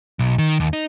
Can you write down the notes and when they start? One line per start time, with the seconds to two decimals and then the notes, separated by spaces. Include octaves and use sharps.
0.19 B1
0.38 D#3
0.60 D#2
0.73 D#4